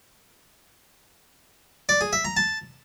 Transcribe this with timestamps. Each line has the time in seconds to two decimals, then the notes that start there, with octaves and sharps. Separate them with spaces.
1.89 D5
2.01 G#4
2.13 E5
2.25 A#5
2.37 A5